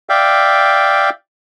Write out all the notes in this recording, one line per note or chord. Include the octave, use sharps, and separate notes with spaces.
D5 E5 F5 G5